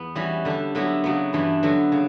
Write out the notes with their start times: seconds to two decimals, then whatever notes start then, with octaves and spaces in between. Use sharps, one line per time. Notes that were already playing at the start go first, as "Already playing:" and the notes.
Already playing: E2 B3
0.15 E3 G3 C#4 F#4
0.45 D3 G3 D4 G4
0.75 D3 F#3 B3 E4 G4
1.04 C#3 F#3 B3
1.33 G2 E3 G3 B3 D4
1.63 D3 F#3 B3 F#4
1.92 C#3